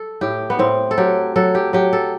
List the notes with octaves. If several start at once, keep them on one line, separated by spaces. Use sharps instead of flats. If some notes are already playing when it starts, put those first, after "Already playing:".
Already playing: A4
A2 G4
B3
A2 C4
A4
F#3 G4
F#3 A4
G4
F#3 G4
A4